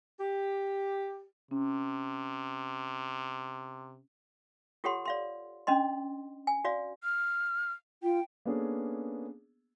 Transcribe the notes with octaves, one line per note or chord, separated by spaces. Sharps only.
G4
C3 C#4
F4 G4 A4 C#5 F#5 C6
D5 F5 C6
C#4 D4 D#5 C6
G#5
F#4 D5 F5
F6
F4 G5
A#3 B3 C#4 D4 G#4 A4